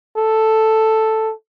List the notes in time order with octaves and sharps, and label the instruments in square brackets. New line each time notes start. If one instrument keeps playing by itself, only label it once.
[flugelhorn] A4